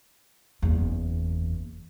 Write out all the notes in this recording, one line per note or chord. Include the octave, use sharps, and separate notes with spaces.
F#1 E2